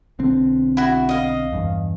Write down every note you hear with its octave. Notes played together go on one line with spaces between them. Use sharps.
B1 D3 C4
E4 F#4
D#5 F5
E2 G2